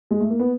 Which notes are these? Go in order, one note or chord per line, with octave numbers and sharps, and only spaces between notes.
G#3
A3
A#3
B3